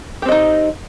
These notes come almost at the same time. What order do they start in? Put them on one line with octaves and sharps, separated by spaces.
G4 C4 D#5 D#4